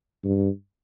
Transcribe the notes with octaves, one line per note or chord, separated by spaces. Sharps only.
G2